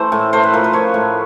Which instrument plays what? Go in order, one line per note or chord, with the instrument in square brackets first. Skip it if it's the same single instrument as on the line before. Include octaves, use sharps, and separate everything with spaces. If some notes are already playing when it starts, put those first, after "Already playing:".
Already playing: [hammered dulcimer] E3 A3 C5
A2
A3 C5
B4
F3 A#4
B4
F3 C#5
A2